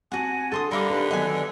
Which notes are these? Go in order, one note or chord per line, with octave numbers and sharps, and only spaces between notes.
C4 F#4 F#5 G#5 A5
D3 F#4 A4 C6 D#6
D3 G3 G4 A4 A#4 F5 B5 D6
D4 D#4 G4 B4
D#3 F#3 B3 D#5 G#5